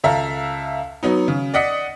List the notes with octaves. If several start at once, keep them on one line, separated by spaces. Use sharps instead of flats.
C#2 A4 E5 F5 A#5
F#3 B3 D#4
C#3
D5 D#5 F#5 D#6 B6 C#7